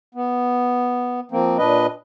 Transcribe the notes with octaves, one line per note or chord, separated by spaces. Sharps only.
B3
F3 A#3 C4
A#2 D4 B4 D#5